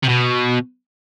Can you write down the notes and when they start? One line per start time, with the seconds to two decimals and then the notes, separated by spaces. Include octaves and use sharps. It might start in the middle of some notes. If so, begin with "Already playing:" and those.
0.03 C3
0.09 B2